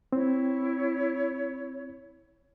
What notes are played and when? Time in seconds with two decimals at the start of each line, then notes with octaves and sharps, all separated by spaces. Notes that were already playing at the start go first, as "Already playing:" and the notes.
0.12 C4 E4 C#5